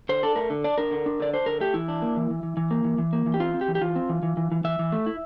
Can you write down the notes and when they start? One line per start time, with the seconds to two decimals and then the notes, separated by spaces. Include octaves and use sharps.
0.09 D3 C5
0.23 D4 A4
0.36 A3 A#4
0.50 D3
0.64 D4 D5
0.78 D4 A#4
0.91 D3
1.06 D4
1.20 D3 D5
1.33 D4 C5
1.46 D3 A#4
1.60 A3 G4
1.74 E3 E4
1.88 D4
2.02 A#3
2.17 E3
2.30 E3
2.43 E3
2.57 E3
2.71 A#3
2.84 E3
2.98 E3
3.13 A#3
3.26 E3
3.34 G4
3.40 C4 F4
3.54 C4
3.61 G4
3.68 E3
3.75 G4
3.81 E3 F4
3.96 C4
4.09 E3
4.23 E3
4.37 E3
4.52 E3
4.64 E3 E5
4.79 E3
4.92 A3
5.06 E4